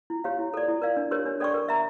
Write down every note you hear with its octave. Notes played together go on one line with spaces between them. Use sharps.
E4
G4 C#5 F5
E4
A4 D5
E4
A#4 D5 F5
D4
G4 A#4 C#5
D4
A4 D5 G5 C#6
A#4
E5 A#5